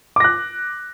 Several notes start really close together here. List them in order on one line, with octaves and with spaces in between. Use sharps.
D6 A#6 F#6